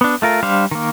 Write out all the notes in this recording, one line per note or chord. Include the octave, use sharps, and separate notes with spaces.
B3 D4
A3 F4 A#4
G3 D4 C5 F5
D#3 A#3